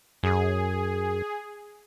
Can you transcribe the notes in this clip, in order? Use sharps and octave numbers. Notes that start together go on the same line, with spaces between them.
F#2 G#4